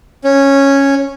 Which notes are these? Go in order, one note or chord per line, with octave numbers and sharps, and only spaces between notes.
C#4